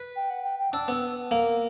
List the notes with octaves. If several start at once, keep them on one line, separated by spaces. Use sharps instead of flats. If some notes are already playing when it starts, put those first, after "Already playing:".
Already playing: B4
G5
F#5
G5
G5
D4 E6
B3
A#3